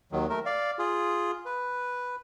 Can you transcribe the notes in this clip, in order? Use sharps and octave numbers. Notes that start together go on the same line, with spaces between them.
D#2 D#3 F#3
A3 A#4
D5 F5
F4 G#4
B4